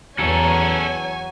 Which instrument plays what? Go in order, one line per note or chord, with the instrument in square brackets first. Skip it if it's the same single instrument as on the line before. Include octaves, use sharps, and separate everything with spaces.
[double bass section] E2 [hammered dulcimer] F#3 [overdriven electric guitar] C#4 A4 [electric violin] C#5 G#5